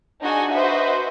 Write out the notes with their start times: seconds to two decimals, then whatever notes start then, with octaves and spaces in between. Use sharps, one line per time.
0.21 D4 D#4 F#4 G#4 G#5
0.51 F#4 B4 C5 D#5 E5